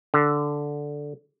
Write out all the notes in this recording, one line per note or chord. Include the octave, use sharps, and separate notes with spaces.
D3